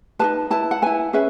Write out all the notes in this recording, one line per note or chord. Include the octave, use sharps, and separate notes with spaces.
D#4 G#4 B4 A5
E4 B4 A5
F#5
E4 B4 G#5
C#4 G#4 B4 E5